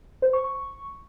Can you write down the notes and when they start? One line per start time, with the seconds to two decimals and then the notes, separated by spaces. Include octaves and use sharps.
0.22 C5
0.33 C#6
0.44 C#6